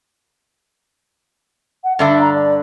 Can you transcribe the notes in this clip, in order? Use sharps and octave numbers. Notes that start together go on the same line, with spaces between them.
F#5
G2 D3 D4 E5
A#5
D5